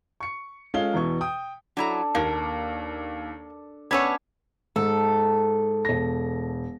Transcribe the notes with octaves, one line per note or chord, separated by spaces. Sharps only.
C#6 C#7
G#3 C#4 F4 A4 F5 G7
E2 B2 E3 C#6
G5 D#6
F#3 D4 E4 A4 A#5
D#2 A#3 A#4
B3 C#4 D4 C#5 F#5 E6 G#6
G#2 A4
E1 A#6